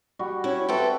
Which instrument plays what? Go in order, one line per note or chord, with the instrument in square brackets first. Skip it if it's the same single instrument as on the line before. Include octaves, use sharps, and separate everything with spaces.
[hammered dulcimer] G3 F#4
[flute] C#4 [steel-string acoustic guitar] E4
[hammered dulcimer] C4 F#4 [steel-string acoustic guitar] A4 B4 G5 [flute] E5